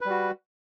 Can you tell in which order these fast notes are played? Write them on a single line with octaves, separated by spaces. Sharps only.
B4 G3 F#4